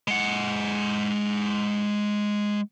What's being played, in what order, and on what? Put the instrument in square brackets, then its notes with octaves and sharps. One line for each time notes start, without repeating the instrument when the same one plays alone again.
[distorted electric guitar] G#3 F#5